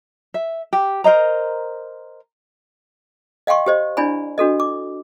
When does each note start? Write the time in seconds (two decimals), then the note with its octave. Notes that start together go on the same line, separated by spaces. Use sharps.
0.34 E5
0.73 G4
1.04 A#4 C5 D#5 A#5
3.47 D#5 F5 G5 C6 C#6
3.66 G4 C5 D#5
3.97 D4 E4 D5 G#5 B5
4.38 D4 F#4 A4 D#5
4.60 D6